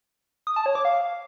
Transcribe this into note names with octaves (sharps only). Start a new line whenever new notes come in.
D#6
A5
C#5
D6
F5